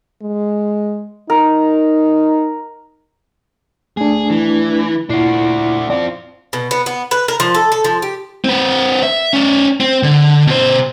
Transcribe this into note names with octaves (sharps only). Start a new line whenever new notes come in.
G#3
D#4 A#4
A3 D4 G#4
E3
A#2 D4 E4 F#4 C7
C4 F4 D5
B2
B3
B3
B4
A#4
F3
A4
A4
F3
G4
C4 B4
E5
C#4 D5
C4
D3
B2 C5